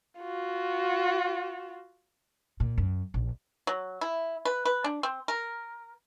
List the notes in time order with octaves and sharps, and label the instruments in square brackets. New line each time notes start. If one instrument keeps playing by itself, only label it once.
[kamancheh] F4 F#4
[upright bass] A#2
F#2
A#1
[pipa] F#3
E4
B4
B4
D4
C4
A#4